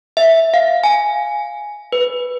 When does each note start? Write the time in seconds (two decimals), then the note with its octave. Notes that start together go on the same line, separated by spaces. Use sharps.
0.17 E5
0.54 F5
0.84 G#5
1.92 B4